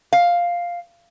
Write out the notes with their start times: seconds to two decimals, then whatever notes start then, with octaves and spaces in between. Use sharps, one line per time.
0.13 F5